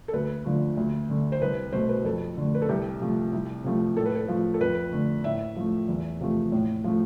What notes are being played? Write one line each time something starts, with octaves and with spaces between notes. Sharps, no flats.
A4
D2 B4
D3 F3 A3
D2
D3 A3
C5
C2 B4
B2 A3 C5
B4
F2 A4
D3 A3
B4
A4
C2 G4
C3 F3 A3
C2
C3 F3 A3
A2 A4
B4
A4
F3 A3
A4
F2 B4
D3 A3
A2 E5
F3 A3
E2
C3 F3 A3
A2
F3 A3